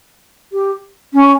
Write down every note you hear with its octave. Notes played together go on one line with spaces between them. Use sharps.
G4
C#4